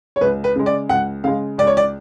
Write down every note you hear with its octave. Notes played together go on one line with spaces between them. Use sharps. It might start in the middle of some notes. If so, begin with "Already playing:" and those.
C#5
C#2 B4
B4
C#3 G#3
D5
C#2 F#5
C#3 G#3 F5
C#2 D5
C#5
D5